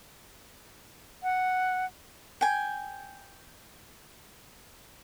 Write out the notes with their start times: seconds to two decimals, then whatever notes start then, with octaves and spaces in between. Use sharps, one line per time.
1.23 F#5
2.41 G5 G#5